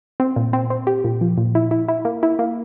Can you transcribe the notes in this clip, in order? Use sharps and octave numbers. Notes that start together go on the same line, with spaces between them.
C4
A#2
C4
C4
G4
A#2
F3
A#2
E4
E4
E4
A#3
E4
A#3